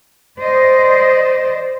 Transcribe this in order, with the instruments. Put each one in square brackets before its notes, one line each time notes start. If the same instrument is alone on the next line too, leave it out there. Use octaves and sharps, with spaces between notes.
[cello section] C5 D5 D#5